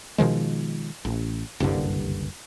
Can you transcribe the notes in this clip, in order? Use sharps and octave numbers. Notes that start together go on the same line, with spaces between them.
B2 D#3 F3 G#3
A1
F#1 C2 G2 D3